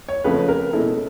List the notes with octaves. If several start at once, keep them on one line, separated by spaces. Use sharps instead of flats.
C#5
F2 C#3 F3 A3 B4
A#4
B2 G#3 C#4 E4 A4